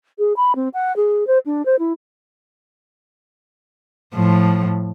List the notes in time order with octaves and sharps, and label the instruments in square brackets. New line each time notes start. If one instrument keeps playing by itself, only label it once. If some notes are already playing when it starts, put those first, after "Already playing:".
[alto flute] G#4
B5
C4
F#5
G#4
C5
D4
C5
E4
[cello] A2 F3